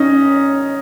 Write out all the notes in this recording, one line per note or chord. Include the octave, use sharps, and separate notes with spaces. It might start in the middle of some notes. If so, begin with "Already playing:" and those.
Already playing: C#4 D#4